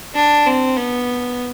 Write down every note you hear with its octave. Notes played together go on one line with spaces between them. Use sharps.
D4
C4
B3